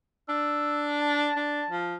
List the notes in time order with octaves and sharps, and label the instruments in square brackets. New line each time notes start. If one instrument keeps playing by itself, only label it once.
[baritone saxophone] D4 [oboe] E6
[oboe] A5
[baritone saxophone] D4
F3